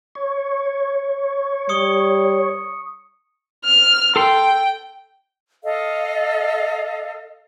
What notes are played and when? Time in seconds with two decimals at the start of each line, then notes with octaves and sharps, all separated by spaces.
0.15 C#5
1.69 G3 C#6 D#6 C#7
3.65 F6
4.16 A4 G5 C6
5.63 A4 D#5 F5